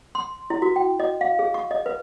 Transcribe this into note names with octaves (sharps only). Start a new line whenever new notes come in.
C6
E4
F#4
G5
D#5
F5
G#4
C#6
D#5
B4